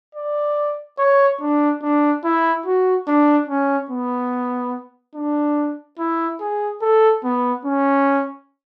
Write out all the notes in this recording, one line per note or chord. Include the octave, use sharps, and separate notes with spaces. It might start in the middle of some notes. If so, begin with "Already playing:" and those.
D5
C#5
D4
D4
E4
F#4
D4
C#4
B3
D4
E4
G#4
A4
B3
C#4